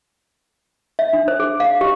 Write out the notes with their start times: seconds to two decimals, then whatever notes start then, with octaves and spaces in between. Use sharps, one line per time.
0.99 E5
1.13 D4
1.28 C5
1.40 G#4
1.60 F5
1.81 G4